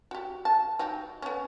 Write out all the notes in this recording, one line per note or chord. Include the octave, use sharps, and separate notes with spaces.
F#4 G4
A5
F#3 D#4 G4
B3 C#4